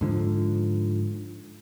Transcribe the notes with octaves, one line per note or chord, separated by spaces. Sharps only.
G#2 D3 F3